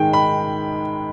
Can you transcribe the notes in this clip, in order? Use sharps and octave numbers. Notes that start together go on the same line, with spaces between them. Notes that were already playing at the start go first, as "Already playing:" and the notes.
Already playing: G#2 D#3 G#3 G5
B5